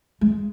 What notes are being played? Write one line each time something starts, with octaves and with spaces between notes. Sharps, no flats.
G#3